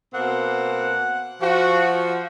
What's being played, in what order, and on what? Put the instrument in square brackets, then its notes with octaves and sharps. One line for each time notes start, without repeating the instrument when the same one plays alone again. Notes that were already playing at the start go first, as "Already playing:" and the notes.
[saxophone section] B2 A#3 C4 [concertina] F#5
[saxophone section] F3 [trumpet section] F#4